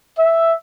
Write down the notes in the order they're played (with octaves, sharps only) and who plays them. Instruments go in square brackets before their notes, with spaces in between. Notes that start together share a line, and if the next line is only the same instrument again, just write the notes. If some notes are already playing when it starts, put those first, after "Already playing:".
[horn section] E5